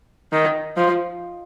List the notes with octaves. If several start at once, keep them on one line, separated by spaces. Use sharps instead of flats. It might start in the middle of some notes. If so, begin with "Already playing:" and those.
D#3
F3